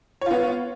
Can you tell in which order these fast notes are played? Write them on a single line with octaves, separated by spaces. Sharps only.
C#5 F4 B3